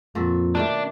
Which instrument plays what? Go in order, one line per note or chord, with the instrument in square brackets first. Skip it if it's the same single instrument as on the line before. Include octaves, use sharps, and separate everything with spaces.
[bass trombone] F2 [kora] A#2 F#4 A4
[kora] B2 D#3 A3 [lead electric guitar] D4